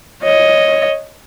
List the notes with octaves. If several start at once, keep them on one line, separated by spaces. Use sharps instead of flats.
C#5 D#5